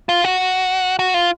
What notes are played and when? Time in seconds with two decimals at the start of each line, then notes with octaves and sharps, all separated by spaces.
0.09 F4
0.24 F#4
0.99 F#4
1.14 F4